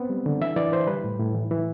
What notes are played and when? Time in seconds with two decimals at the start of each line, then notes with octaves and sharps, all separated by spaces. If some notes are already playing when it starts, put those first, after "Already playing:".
Already playing: B3 C4
0.10 G3
0.26 D3
0.41 E3 E5
0.56 E3 D5
0.72 E3 C5
0.87 G3 B4
1.04 A2
1.19 A2
1.35 E3
1.51 E3